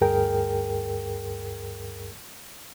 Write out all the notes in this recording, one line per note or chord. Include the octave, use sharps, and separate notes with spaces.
D2 G2 G#4 A#4 G5